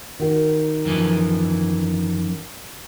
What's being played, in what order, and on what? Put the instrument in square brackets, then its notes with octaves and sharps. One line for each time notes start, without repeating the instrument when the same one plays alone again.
[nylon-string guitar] D#3 F#4
[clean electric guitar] F#2 E3 F3